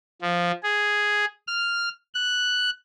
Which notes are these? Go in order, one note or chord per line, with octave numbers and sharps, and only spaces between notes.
F3
G#4
F6
F#6